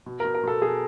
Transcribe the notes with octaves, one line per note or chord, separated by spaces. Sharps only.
B2
A#4
B2
A#4
B2 A4
B2 G#4